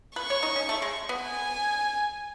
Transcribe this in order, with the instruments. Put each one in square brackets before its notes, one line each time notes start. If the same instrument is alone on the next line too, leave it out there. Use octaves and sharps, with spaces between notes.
[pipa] B4 [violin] C#6
[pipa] C#5
D#4
C#4
A3
G#3
B3
[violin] G#5